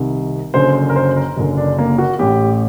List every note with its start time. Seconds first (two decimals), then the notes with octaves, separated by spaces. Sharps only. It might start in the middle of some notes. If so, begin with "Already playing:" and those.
Already playing: C2 C3 D#3
0.54 F#1 F#2 D3 C5
0.89 A#4
0.96 C5
1.16 A#4
1.37 F#1 F#2 D3
1.57 D4
1.78 A#3
1.98 F#4
2.19 A1 A2 G4